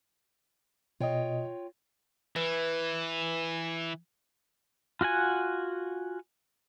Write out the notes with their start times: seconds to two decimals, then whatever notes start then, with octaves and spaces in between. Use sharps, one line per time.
1.01 B2 F4 C#5 D#5 G5
2.36 E3 B4
5.01 F4 F#4 F#5 G#5